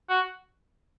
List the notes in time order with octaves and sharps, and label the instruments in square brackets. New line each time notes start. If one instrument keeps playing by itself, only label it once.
[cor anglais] F#4